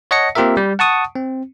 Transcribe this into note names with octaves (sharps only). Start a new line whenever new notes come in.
C#5 D#5 F#5 A5 A#6 C#7
A#3 C4 F4 G4 A#4 E5
G3
F#5 A5 C#6 D#6
C4